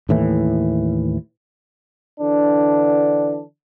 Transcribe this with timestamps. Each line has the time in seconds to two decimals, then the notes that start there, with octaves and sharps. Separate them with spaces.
0.09 D#2 A2 E3
2.21 D3 E3 D4